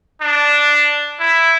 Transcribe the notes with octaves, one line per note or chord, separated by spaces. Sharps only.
D4
E4